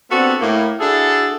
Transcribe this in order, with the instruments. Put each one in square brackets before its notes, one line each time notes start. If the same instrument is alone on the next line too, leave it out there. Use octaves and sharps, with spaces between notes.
[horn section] B3 C4 D4 F#4 G4 A4
A2 A#3
D4 E4 F#4 G#4 A4